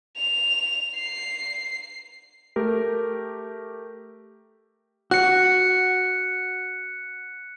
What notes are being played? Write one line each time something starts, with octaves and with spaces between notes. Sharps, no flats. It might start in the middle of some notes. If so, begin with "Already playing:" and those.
F7
C7
A3 G4 A#4
F#4 F#6 C#7